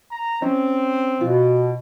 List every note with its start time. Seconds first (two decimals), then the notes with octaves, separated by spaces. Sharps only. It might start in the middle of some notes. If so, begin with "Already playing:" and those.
0.11 A#5
0.42 C4 C#4 D#5
1.21 B2 F4